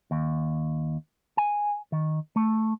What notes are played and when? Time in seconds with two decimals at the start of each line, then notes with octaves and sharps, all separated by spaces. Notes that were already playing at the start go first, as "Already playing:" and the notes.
0.11 D#2
1.37 G#5
1.92 D#3
2.36 A3